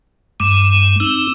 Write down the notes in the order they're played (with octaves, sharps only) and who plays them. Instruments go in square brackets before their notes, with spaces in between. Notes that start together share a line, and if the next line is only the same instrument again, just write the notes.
[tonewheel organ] G2 G#3 [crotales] D6 D#7 E7
[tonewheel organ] C4 D#4 [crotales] E6